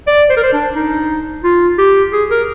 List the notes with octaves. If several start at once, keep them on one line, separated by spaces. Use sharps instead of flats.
D5
C5
A#4
C5
D4
D#4
F4
G4
G#4
A#4